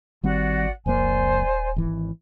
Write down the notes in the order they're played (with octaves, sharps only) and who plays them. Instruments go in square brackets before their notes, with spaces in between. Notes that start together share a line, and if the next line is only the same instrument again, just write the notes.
[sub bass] G#1 [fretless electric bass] D#3 G3 C4 [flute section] F#4 D5 F#5
[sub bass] D#1 [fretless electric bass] C2 F2 A#3 [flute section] C5 D5 G#5
[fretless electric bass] G#1 E3